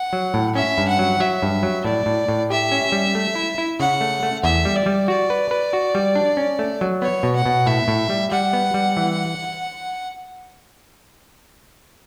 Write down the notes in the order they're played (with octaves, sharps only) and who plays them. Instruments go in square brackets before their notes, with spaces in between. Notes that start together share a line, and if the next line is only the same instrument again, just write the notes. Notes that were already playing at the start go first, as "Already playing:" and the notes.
Already playing: [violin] F#5
[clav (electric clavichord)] F#3
A2
[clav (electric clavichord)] C#4 [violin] E5
[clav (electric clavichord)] G2
[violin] F#5
[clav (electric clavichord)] F#3
[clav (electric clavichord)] F#3 [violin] E5
[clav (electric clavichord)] G2
F#3
[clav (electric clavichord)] A2 [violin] D5
[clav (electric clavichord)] A2
A2
[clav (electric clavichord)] G4 [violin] E5
[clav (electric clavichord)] C#4
G3
A3
E4
E4
[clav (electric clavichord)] C#3 [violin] F#5
[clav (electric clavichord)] A3
A3
[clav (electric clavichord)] E2 [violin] E5
[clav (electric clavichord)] G3
[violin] D5
[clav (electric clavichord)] G3
[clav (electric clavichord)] F#4 [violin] D5
[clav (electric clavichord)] B4
B4
F#4
G3
D4
C#4
A3
F#3
[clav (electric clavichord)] B3 [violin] C#5
[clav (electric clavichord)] B2
[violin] F#5
[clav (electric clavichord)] B2
[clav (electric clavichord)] A2 [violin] E5
[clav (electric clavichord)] A2
G3
[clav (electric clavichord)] G3 [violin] F#5
[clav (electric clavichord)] B3
G3
E3